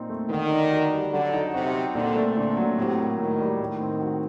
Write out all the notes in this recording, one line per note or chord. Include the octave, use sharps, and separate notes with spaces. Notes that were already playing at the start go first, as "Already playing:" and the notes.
Already playing: A#2 C4 D#4
A3
D3 D#3
D4
F#4
G3
D3 F#3
D#4
C3 F#4
C4
A#2 D3
A3
A#2 D3
F#3
A2 C3
A#3
A2 D#3
G3
A2 D#3
C4
F#4